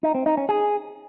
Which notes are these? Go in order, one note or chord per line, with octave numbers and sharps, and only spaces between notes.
D#4
C4
D#4
C#4
G#4